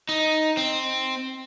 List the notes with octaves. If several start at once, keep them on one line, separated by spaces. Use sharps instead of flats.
D#4
C4